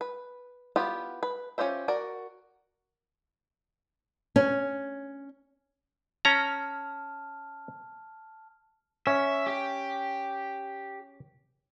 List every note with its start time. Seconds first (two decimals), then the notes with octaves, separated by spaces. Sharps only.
0.01 B4
0.76 B3 E4 F4 G4 B4
1.23 B4
1.58 C#4 F4 G4 C5 E5
1.88 F#4 A#4 D5
4.36 C#4
6.25 C#4 A5 A#5 F6
9.07 C#4 E5
9.47 G4